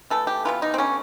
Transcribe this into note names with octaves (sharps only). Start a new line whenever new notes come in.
E3 A3 A4
G4
E3 G3 B3 F4
D#4
C4
D3 G3 B3 C#4